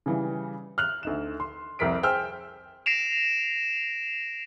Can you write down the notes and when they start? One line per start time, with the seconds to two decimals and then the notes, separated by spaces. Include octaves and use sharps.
0.06 C#3 E3 G3
0.78 F6 F#6 F7
1.03 D2 D#4 E7
1.40 C6
1.79 C2 F2 A#4 B6 D7
2.03 G#4 C5 G5 E6 F6 G6
2.86 A#6 C7 D7 E7 F7